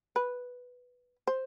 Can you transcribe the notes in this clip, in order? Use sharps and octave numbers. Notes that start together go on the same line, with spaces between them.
B4
C5